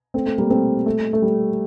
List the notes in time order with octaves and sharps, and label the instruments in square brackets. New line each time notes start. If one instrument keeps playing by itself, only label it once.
[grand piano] A3 C4
A3
G3 A#3
A3 C4
A3
A3
G3